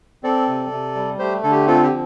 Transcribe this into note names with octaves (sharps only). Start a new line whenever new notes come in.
C4 A4 D5
C3
C3
G3
A3 G4 C5
D3 A4
G4
C4 F4 A4
G4
F3